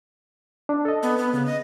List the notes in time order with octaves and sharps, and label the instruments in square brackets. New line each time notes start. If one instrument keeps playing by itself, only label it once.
[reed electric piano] D4
A4 D#5
[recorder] B3
B3
[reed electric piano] C#3 [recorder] B3
[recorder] D#5